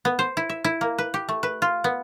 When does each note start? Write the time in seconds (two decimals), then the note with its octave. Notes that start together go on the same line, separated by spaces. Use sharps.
0.05 B3
0.19 C5
0.37 E4
0.49 E5
0.64 E4
0.81 A#3
0.98 B4
1.14 G4
1.29 A3
1.43 B4
1.62 F4
1.84 B3